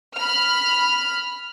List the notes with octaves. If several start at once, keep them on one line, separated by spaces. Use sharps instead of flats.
B5 F6